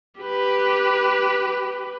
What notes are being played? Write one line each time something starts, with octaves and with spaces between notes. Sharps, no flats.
G4 B4